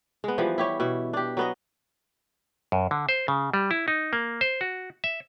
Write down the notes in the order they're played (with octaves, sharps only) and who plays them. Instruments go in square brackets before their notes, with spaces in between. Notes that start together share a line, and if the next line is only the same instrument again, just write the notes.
[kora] G#3 B3
E3 F3 G3
E4 G4 C#5
B2 E4
D4 G4
F#3 B3 D#5
[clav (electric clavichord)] F#2
D3
C5
C#3
G3
E4
D#4
A#3
C5
F#4
E5